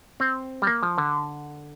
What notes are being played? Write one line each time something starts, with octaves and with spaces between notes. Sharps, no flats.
C4
G3
A#3
F3
D3